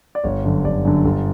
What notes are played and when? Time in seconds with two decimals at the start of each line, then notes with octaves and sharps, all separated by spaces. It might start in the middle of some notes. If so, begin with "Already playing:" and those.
0.15 D5
0.24 G1 C#5
0.44 F#2 D3
0.65 G1 D5
0.85 F#2 D3
1.05 G1